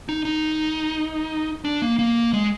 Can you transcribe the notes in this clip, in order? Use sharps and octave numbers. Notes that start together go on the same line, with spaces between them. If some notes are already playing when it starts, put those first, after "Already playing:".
D#4
D#4
D4
A#3
A#3
G#3